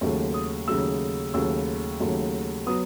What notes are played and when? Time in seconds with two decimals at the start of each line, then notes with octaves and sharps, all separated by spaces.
0.01 D#2 C#3 F#3 A3
0.34 D#6
0.68 D#2 C#3 F#3 A3 E6
1.34 D#2 C#3 F#3 A3 E6
2.00 D#2 C#3 F#3 A3
2.67 F#3 B3 D#6